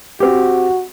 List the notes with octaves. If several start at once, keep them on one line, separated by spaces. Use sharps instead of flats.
C4 F#4 G4